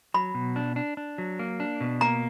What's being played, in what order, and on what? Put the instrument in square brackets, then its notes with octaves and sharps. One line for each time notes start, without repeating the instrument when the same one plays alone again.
[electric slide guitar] F#3 [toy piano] B5
[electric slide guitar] B2
D4
D4
D4
F#3
A#3
D4
B2
[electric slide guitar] A#3 [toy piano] A#5